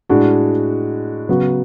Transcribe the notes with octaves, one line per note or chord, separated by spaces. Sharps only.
A2 G#3 D4 F#4
C#3 F#3 B3 F#4